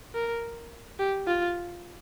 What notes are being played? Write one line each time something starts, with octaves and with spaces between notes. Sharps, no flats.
A#4
G4
F4